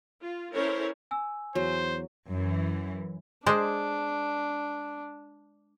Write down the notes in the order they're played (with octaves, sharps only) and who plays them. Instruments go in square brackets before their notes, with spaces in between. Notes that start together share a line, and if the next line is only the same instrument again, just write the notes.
[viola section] F4
C#4 E4 A4 A#4 C5 C#5
[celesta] G#5 E6
[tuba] E2 [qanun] F#3 [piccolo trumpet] C5
[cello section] F#2 E3
[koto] G#3 C5 D5 [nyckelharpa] D4